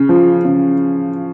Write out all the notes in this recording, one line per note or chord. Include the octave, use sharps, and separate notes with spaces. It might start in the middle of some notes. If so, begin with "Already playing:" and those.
Already playing: C#3
F3
C#3